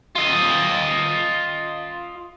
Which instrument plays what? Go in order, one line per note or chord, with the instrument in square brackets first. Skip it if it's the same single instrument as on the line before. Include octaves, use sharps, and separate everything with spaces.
[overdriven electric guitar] F4 D#5